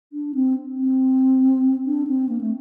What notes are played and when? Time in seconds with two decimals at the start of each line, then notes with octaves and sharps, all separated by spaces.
0.13 D4
0.35 C4
0.78 C4
1.86 D4
2.07 C4
2.29 A#3
2.41 A3